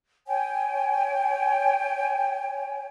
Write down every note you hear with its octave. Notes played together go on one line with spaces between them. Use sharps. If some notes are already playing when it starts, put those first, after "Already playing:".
C#5 G5 G#5